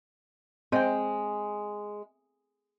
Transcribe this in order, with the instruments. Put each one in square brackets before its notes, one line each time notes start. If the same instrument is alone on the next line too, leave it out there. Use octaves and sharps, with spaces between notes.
[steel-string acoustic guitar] G#3 [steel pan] C4 G5